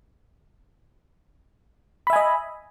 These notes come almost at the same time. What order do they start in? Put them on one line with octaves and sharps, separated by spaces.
B5 E5 G#5 D#5